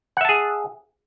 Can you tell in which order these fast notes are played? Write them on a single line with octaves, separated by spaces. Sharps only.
F#5 E5 A5 G#4